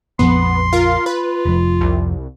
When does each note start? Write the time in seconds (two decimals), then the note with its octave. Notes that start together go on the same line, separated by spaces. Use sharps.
0.19 A#1 F2 F3 B3 C6
0.73 F4 A#4
1.06 F4 B4
1.45 F1 F2
1.81 C2